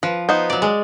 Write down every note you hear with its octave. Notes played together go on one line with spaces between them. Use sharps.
F3 B4
B3 D#4 C5
F#3 D5
G#3